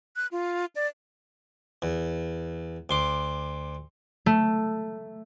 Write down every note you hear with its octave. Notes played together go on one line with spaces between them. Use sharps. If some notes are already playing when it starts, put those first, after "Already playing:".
F#6
F4
D5
E2
D2 C6 D6
A3